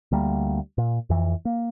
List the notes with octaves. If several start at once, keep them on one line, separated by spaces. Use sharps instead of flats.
D2 G3 A#3
A#2
F2 E3
A#3